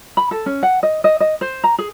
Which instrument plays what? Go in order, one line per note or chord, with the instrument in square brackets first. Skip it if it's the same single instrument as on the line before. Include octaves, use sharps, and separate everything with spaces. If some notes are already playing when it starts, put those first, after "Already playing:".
[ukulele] B5
A4
C#4
F#5
D#5
D#5
D#5
C5
A#5
G#4